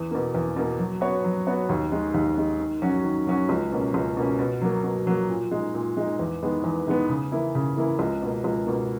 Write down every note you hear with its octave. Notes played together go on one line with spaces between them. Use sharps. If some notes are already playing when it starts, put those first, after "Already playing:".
Already playing: E2
B2 A#3
E2
B2 A#3
F#3
B3 F#4 C#5
F#3
B3 F#4 C#5
D#2
D#3 G#3
D#2
D#3 G#3
D#3
F#3 C#4 F#4
D#3
F#3 C#4 F#4
C#2
B2 A#3 C#4
C#2
B2 A#3 C#4
B2
F#3 A#3
B2
F#3 A#3
A#2
G#3 D#4
A#2
G#3 D#4
E2
D#3 G#3 B3
E2
D#3 G#3 B3
C#3
E3 A#3 E4
C#3
E3 A#3 E4
C#2
B2 A#3
C#2
B2 A#3